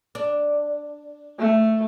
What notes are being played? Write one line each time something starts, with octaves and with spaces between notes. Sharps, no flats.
D4
A3